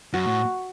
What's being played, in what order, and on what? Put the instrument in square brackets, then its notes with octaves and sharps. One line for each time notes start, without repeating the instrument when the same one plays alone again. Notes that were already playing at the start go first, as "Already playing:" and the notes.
[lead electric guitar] F#2 [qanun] F#4
[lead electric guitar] A2